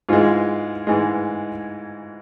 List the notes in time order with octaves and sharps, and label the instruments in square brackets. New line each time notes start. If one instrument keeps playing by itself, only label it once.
[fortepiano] G#2 E3 G#3 F4
G#2 E3 G#3